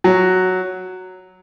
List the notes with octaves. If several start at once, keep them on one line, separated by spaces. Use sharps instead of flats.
F#3